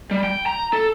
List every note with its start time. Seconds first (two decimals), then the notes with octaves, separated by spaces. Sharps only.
0.11 G3
0.24 G5
0.46 A#5
0.73 A4